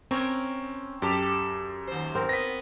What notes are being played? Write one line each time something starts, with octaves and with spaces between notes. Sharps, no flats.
C4 C#4 A#4 C#5
F#2 G4 A4
D#2 C5
C4 A#4
B3 A#6 B6